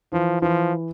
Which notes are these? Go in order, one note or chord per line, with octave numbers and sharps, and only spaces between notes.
E3 F3
E3 F3